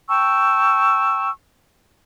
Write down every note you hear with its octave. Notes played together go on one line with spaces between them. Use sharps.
G5 A5 C#6 E6